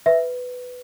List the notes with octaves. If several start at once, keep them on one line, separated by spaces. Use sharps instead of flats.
B4 E5